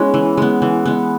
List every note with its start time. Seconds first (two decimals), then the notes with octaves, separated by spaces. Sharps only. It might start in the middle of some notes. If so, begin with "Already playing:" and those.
Already playing: G#3 B3 C#4 E4
0.14 E3
0.37 G#3 B3
0.62 E3
0.86 G#3 B3